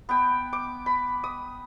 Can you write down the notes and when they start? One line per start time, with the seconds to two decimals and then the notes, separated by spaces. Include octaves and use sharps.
0.09 B3 G5
0.53 D6
0.86 B5
1.24 D#6